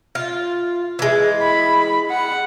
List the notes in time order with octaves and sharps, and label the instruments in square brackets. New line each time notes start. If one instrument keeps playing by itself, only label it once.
[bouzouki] F4
E3 G#3
[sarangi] B5
F#5